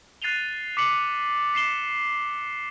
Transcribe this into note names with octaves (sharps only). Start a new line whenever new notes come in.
F#6 A6 C7 D#7 F7 G7
D6 B6 C#7 F#7
B6 C7 E7 G7